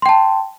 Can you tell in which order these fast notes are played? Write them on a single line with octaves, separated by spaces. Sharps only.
C6 G5 A5